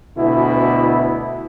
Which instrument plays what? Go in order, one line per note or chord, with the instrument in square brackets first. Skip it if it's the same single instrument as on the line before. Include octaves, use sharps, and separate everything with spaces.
[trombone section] D2 B2 E4